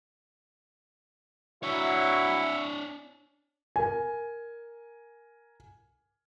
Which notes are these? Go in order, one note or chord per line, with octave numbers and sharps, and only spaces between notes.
F#3 D4 E4 C#5 E5 C#6
A#4 G#5